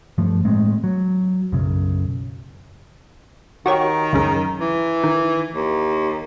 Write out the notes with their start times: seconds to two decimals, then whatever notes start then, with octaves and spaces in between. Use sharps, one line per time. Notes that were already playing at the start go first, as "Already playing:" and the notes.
0.18 G2 F3 A3
0.45 A2 G#3 A3 C4
0.84 F#3
1.52 B1 F#2 C#3
3.66 D#3 F#4 G4 C#5
4.13 C#2 F#2 C#3
4.60 E3
5.04 D#3
5.55 D#2